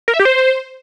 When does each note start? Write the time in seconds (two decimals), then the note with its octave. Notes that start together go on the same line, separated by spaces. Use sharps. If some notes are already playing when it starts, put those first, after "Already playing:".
0.08 A#4
0.14 E5
0.19 G4
0.25 C5